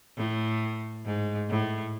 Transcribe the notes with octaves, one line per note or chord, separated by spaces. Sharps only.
A2
G#2
A2